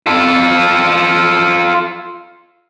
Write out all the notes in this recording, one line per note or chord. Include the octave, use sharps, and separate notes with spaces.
F4 A4